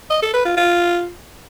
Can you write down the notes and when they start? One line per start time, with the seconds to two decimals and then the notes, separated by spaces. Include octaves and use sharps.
0.11 D#5
0.22 A4
0.34 B4
0.45 F4
0.57 F4